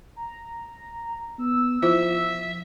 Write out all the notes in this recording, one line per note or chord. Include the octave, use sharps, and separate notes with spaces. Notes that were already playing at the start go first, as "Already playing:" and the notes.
A#5
B3 E6
F3 E4 F4 C5 E5